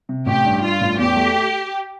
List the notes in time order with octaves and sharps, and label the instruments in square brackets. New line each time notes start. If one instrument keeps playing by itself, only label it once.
[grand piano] C3
[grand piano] A1 [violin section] G4
[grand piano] G2
[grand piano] G2 [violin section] F4
[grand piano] A1
[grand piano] E2 [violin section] G4
[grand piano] A3